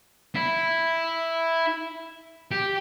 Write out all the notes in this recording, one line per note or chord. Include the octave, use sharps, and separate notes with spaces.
E4
G4